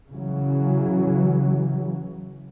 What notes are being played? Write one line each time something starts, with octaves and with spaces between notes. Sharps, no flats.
C#3 E3 F#3